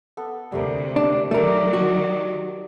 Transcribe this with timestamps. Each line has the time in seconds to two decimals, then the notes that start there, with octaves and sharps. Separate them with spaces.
0.17 B3 A4
0.52 D2 C3 G3 A3 A#4
0.96 D4
1.31 D#3 F#3 A3 A#4 D5
1.73 F#4 A5 A#5